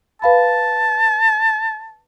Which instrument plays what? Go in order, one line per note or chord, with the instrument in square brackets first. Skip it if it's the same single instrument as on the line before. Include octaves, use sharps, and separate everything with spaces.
[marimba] B4 F5 B5 [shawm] A5